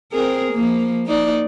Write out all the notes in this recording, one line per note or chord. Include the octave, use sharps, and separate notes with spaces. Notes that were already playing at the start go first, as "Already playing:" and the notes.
C4 G#4 A#4
F3 A#3
A#3 D#4 D5